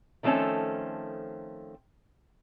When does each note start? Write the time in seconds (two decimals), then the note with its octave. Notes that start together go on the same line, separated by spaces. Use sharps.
0.23 D#3 F3 A3 C4 C#4 A4